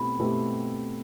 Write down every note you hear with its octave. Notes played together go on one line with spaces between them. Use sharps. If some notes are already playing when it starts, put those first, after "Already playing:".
Already playing: B2 A3 C4 E4 G4 B5
B2 A3 C4 E4 G4